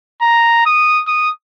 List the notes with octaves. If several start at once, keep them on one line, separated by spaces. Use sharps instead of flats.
A#5
D#6
D#6